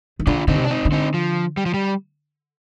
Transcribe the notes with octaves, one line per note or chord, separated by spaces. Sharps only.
D#3
D3 D4 F4
D3 C4 D#4
C3
D4
C4 D#4
D3
C4 D#4
F3
G3
F3
G3